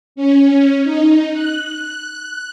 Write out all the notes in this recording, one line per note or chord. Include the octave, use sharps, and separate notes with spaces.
C#4
D#4
F#6